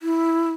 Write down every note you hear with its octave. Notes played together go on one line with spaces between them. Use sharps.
E4